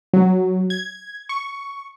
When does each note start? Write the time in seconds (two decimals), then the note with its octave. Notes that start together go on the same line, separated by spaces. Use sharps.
0.13 F#3
0.70 G#6
1.29 C#6